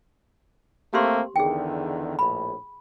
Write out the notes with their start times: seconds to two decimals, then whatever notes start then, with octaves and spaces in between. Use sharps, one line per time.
0.94 A3 A#3 C4 G4 C6
1.36 E2 D3 D#3 G#4 G5
2.19 A#1 A2 B5